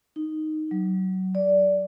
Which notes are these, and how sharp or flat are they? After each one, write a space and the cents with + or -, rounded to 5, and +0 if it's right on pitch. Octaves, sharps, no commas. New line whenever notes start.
D#4 -5
F#3 +20
D5 -15